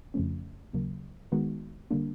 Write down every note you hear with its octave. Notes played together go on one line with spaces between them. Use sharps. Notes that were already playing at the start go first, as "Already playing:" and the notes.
F2 C#3 F3 A3 C#4
D#2 C#3 F#3 A#3
D#3 G#3 B3 D#4 F#4
D3 G3 A#3 D4